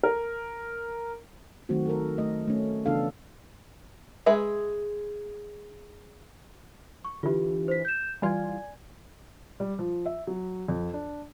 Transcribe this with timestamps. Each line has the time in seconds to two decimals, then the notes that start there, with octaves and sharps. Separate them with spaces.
0.03 A#4
1.69 D#3 F#3 A3 C4 F#4
1.86 A4 A#4
2.18 A3 D#5
2.47 A3 C#4
2.86 C#3 E3 B3 D4 A4 F5
4.26 G#3 G#4 B4 E5
7.05 C#6
7.23 D3 E3 F4 G4
7.68 C5 B6
7.85 G6 E7
8.22 E3 G3 F4 D5 G#5 G#6
9.60 G3
9.79 F3
10.06 E5
10.27 F#3
10.68 F2
10.94 D4